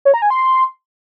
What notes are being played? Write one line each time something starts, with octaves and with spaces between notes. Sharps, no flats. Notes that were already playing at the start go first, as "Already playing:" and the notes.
C#5
A#5
G#5
C6